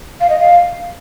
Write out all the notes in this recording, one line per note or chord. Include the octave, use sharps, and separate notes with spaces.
F5
D#5
F5